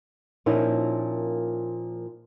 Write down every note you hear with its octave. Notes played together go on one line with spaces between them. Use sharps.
A#2 F3 A#3 C#4 D#4 E4